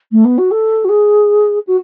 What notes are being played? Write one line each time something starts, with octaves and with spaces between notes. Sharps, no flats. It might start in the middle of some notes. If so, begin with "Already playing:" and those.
A3
B3
F#4
A4
F#4
G#4
F#4